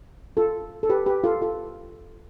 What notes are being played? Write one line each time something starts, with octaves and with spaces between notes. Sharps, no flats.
F4 A4
A4
G4 B4
G4 B4
F4 A4
F4 A4